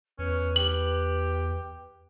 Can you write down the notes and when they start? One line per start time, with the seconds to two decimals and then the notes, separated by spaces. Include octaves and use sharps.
0.19 E2 C#4 B4
0.56 G4 F#7